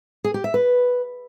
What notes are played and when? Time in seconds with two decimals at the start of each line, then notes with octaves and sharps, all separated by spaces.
0.24 G#4
0.34 G4
0.44 E5
0.54 B4